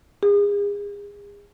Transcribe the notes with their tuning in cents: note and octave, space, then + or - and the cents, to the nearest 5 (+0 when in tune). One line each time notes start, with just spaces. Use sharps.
G#4 -35